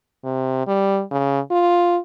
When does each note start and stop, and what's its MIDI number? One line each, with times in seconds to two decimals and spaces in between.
0.24 0.67 48
0.67 1.02 55
1.11 1.40 49
1.51 1.98 65